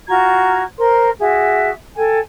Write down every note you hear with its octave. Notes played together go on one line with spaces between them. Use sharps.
F4 F#4 A#5 G#6
A#4 C5 C6
F#4 G#4 E5
A4 G5 G#5